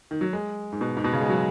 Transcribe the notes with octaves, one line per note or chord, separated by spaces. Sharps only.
D#3
F#3
G#3
G#2
B2
G#2
B2
C#3
G#3
F#3